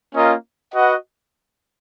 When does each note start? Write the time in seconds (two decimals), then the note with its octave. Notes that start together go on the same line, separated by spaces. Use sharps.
0.14 A#3 C#4 F4 A#4 D#5
0.73 F#4 B4 D#5 F#5